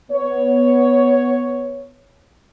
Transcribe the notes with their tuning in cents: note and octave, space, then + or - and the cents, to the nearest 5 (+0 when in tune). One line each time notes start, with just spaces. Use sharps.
B3 +0 C#5 +5